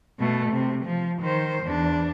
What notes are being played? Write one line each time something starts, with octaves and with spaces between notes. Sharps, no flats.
B2 A3
C3
F3
D#3 C5
E2 D4